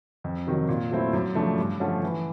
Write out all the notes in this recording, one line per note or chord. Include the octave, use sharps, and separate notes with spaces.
F2
C3 D#3 F#3
A#2
F#3 A3 C4 E4
F#2
C#3 F3 A3 D4
G2
D3 F3 A3 C#4
E3